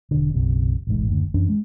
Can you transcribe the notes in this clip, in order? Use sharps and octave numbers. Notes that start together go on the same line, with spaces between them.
E1 D3
F#1 B1 C3
E1 A1 G#2
F#1 D2
F#2 E3 C#4 D4
G#3